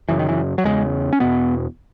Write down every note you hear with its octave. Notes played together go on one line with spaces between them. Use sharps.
F#2 C#3 E3
D#3
E3
F#3
E2 C#3 G#3
C#4
E2 B2 B3